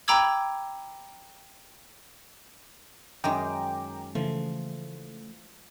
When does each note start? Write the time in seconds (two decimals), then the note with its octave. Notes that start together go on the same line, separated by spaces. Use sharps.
0.08 G5 A#5 B5 D6 E6 G#6
3.24 F#2 D#3 G#3 G5 A#5 D6
4.15 C#3 E3 F3 A3